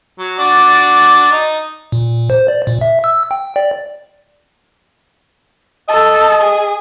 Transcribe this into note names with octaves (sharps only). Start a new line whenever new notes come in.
F#3
D4 F#4 D5
D#4
A#2
C5
D5
A#2
E5
E6
G5
D5
A4 D#5
G#4